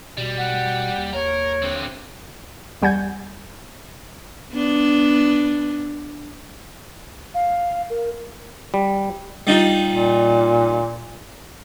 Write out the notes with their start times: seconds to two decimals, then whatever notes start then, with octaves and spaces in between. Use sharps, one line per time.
0.17 B2 G3
0.38 F#5
0.98 D#2
1.14 A#4 C#5
1.62 D3 C4
2.82 E2 G3 F#5 G#5 G6 G#6
4.53 B3 D4
7.34 F5
7.89 A#4
8.74 G3
9.47 G3 D#4 F4
9.89 A#2